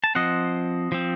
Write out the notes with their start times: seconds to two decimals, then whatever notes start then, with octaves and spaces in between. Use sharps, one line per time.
0.04 A5
0.15 F3 C4 D#5 F#5
0.92 F3 C4